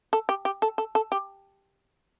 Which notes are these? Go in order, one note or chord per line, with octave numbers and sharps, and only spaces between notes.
A4
G4
G4
A4
A4
A4
G4